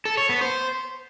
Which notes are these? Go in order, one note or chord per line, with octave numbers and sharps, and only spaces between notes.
A4
C#5
B3
C5